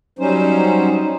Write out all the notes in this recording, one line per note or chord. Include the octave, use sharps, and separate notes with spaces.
F#3 G3 C#4 D#4 C5